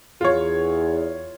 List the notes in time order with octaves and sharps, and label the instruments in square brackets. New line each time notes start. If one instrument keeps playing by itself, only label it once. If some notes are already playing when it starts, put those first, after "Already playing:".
[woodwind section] E2 [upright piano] F4 C#5